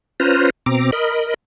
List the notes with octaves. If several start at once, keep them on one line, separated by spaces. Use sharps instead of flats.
C#4 F4 B4 C5 A#5
B2 C4 A#5 D6
A#4 D#5 B5